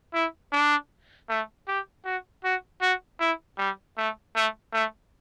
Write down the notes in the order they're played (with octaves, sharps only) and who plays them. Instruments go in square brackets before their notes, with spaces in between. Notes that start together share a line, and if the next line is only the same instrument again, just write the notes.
[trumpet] E4
D4
A3
G4
F#4
F#4
F#4
E4
G3
A3
A3
A3